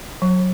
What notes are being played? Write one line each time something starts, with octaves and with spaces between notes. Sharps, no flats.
F#3